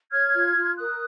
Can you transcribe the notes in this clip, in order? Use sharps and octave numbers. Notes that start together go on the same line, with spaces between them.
C#5 F6 G#6
F4
F4
A#4 D#6 F#6